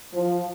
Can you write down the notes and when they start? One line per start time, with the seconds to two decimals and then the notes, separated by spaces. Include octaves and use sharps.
0.14 F3